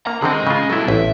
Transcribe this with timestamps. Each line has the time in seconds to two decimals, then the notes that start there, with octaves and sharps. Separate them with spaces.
0.07 A#3 A#5
0.23 D3 D#3 C4 G#4 D#5
0.47 C#3 F4
0.70 B2 F#3 E4 A4
0.88 A1 E5